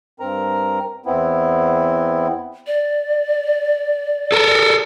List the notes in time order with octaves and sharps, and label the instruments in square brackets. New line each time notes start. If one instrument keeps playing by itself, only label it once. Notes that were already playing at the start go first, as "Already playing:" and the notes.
[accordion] G2 C4 A#4 A#5
E2 B3 C4 E4
[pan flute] D5
[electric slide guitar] A4 A#4